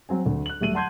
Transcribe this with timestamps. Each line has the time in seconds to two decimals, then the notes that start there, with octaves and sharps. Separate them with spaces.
0.09 F#3 C4 G#5
0.26 D2
0.46 F#6 F#7
0.61 D1 G3 A3 D#7 F#7
0.74 F#5 A5 C6 G6 G#6